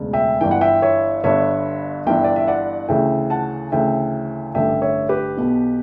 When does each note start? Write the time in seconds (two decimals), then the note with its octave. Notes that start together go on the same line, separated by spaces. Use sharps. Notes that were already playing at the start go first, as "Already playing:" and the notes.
Already playing: E1 D2 C#3
0.13 E5 G5
0.41 G1 G2 E3 G5
0.51 F#5
0.61 E5 G5
0.82 C#5 E5
1.24 G1 G2 D3 C#5 E5
2.06 G1 G2 E3 E5 G5
2.24 D5
2.36 E5
2.48 D5 F#5
2.89 D2 C#3 E3 E5 G5
3.30 F#5 A5
3.72 D2 C#3 E3 E5 G5
4.55 A1 G2 D3 E5 G5
4.82 C#5 E5
5.09 G4 B4
5.37 B1 B2